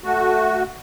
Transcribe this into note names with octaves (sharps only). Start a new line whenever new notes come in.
A3 F#4